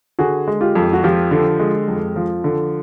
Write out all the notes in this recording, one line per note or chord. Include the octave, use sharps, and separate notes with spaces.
D3 F#4 G#4
G#3
F4 G4
F2
F#4
F3 F4 G4
D3
G#3
F2
F3
D3